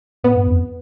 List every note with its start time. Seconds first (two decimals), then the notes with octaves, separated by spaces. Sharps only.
0.24 A2 B3
0.36 G2
0.47 F2